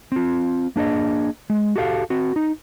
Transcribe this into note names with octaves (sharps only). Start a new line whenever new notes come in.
C4 F4
A#3 D4 G#4 D#5
G#3
F#4 G4 A4 E5 F5
C4 F#4
D#4